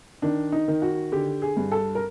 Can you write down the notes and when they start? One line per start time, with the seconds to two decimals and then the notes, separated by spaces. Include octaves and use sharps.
0.22 D#3 D4
0.52 D#4
0.68 D#3
0.82 F#4
1.12 D3 G4
1.42 G#4
1.57 G2
1.72 A4
1.95 A#4